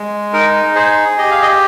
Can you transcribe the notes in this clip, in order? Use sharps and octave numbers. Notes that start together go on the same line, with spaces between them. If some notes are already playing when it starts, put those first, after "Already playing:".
Already playing: G#3
D#4 A#4
G#4 C5
G4 D#5
F5
D#5